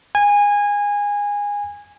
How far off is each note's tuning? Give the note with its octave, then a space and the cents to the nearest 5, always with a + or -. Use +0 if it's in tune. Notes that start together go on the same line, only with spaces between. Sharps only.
G#5 -20